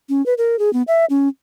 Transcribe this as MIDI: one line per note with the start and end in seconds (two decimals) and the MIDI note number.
0.09 0.24 61
0.26 0.34 71
0.38 0.59 70
0.59 0.72 68
0.73 0.83 59
0.88 1.05 76
1.10 1.28 61